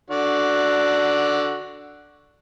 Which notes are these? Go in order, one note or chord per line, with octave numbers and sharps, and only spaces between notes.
D3 F#4 D5